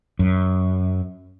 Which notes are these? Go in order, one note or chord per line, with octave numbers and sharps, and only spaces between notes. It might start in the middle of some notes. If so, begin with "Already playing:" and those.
F#2